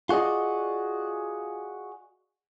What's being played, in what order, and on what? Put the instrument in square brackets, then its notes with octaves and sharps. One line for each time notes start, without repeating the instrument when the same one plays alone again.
[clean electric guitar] F4 F#4 G#4 D5 D#5